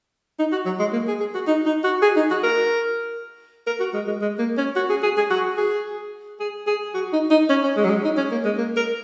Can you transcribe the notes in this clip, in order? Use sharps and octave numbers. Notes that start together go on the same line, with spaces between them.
D#4
F#4
F#3
G#3
A#3
G#4
G#4
F#4
D#4
D#4
F#4
G#4
D#4
F#4
A#4
A#4
F#4
G#3
G#3
G#3
A#3
C#4
F#4
G#4
G#4
G#4
F#4
G#4
G#4
G#4
F#4
D#4
D#4
C#4
C#4
G#3
F#3
G#3
D#4
C#4
A#3
G#3
A#3
A#4